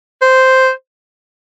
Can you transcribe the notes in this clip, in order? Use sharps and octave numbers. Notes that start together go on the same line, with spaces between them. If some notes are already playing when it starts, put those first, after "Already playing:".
C5